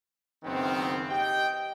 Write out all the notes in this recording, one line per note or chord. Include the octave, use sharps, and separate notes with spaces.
F#1 D#3 B3 C4
G4 D#5 G5